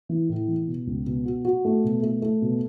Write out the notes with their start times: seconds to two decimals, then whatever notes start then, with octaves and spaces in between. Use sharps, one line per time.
0.09 E3
0.29 A2
0.48 E3
0.68 B2
0.87 C#2
1.06 B2
1.25 F#4
1.45 F#4
1.65 A3
1.84 B2
2.03 A3
2.22 A3
2.42 B2